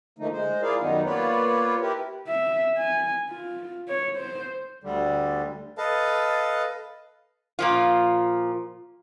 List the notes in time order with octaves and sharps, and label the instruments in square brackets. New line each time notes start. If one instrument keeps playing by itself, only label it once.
[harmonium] D3 F3 A3 A#3 D#4
G#3 C5
E4 F4 G#4 A#4 D5 F5
F#2 D#3 G3 B3 D#4
A#3 B3 F4 B4 C#5 D5
E4 G4 A#4 B4
[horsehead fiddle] E5
G#5
F4
C#5
C5
[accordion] D2 D3 G3
[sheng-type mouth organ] A4 B4 D#5 F5 A5
[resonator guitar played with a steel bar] A#2 F3 F4